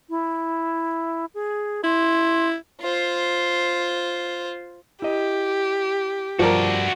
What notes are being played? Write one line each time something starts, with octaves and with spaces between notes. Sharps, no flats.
E4
G#4
E4 C6
F4 C5
E4 G4 D#5
G2 F3 G3 F#4 A#4 D5